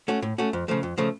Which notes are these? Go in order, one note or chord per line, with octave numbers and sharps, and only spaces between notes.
A3 C#4 F#4
A2
A3 C#4 F#4
F2
C#3 F3 A3
F2
C#3 F3 A3